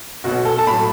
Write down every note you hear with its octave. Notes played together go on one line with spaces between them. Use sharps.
B1 B2 B3 F#4
A4
A5
A1 A2 F#3 B5